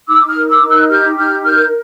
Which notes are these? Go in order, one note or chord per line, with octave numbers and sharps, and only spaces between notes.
D#4 D6 E6
D#6 F6
A#4
D6 E6
D#4
E6 F#6
G4 F6 G6
D#4 F6 G6
A#4 F6 G6